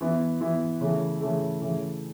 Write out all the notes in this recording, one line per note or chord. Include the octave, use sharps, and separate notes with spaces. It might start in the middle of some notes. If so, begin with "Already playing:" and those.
E3 B3 E4
E3 B3 E4
C#3 E3 A3
C#3 E3 A3
C#3 E3 A3